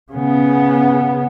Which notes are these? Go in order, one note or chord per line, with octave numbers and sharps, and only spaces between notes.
C#3 B3